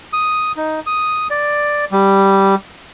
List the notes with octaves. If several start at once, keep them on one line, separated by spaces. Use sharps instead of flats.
D#6
D#4
D#6
D5
G3